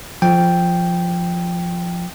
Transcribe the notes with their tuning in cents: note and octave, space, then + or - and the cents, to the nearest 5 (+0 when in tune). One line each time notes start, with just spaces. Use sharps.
F3 +0 G5 +0